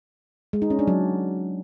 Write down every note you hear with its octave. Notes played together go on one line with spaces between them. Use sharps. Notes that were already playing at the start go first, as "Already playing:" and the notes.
G#3
D#4
C#4
D4
F#3